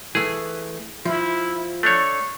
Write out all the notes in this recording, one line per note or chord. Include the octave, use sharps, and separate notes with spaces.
E3 A3 G#4
F3 E4
A3 D4 C#5 C#6